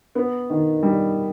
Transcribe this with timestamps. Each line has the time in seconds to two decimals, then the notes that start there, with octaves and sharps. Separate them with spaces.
0.15 B3
0.50 D#3
0.83 G3